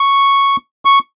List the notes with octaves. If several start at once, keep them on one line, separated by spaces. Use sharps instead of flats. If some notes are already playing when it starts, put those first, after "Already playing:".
Already playing: C#6
C#6